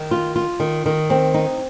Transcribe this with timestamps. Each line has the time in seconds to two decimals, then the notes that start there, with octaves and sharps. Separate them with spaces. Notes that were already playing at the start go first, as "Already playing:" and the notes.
Already playing: D#3
0.11 F4
0.36 F4
0.60 D#3
0.86 D#3
1.10 C4
1.34 D#4